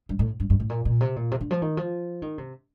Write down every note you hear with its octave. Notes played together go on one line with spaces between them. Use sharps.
G2
A2
G2
G2
A2
A#2
A#2
C3
A#2
C3
D3
F3
D#3
F3
D#3
C3